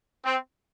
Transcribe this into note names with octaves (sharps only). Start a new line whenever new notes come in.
C4